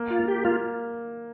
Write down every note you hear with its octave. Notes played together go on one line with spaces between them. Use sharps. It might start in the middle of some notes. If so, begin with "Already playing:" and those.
Already playing: A#3
F4
A#3
G4
A#3 F4